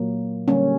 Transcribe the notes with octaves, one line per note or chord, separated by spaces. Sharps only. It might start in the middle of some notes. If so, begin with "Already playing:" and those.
Already playing: A#2 F#3 A#3
D3 G3 A#3 C#4